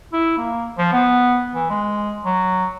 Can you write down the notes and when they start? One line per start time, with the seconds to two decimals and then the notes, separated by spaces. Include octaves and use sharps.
0.13 E4
0.37 A#3
0.78 F3
0.92 B3
1.55 E3
1.70 G#3
2.24 F#3